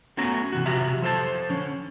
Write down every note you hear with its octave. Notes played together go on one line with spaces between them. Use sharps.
A3 B3 C#4 F#4 A#5
C3 E3 F#4
C3 F3 F#4 G4 E5 A#5
F3 A4 C5 A5
D3 C#4